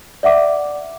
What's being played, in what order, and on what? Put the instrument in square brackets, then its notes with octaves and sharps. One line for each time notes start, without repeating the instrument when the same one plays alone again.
[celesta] D5 E5 F#5 D6